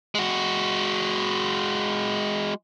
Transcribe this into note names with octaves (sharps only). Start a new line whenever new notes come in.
G#3 F#4